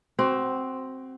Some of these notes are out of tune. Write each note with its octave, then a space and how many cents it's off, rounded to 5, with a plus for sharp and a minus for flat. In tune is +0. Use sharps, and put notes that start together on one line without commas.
C4 +0 F#4 +25